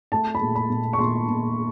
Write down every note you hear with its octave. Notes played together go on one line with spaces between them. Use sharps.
A3 A5
B5
A#2
B5
A#2
C#6
A#2 C6
A#2